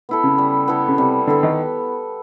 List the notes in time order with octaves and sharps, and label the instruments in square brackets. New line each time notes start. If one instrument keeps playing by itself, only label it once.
[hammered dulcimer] B3 E4 A4
[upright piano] C#3
[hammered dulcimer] G3
B3 E4 A4
[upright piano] C#3
[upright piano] C3 [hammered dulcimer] G3
[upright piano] D3 [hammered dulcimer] B3 E4 A4
[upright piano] D#3